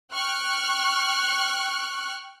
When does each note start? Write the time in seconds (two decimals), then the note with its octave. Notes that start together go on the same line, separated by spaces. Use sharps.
0.12 G5 C#6 F6 F#6